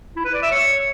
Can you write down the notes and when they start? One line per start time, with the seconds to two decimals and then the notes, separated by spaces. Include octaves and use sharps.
0.16 E4
0.25 B4
0.34 D5
0.42 E5
0.51 C#5